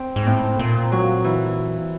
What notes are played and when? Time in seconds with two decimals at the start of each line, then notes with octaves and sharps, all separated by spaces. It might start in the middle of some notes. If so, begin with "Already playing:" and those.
Already playing: C4
0.16 G#2
0.27 A2 C4
0.59 A#2 C4
0.92 F#3
1.24 E3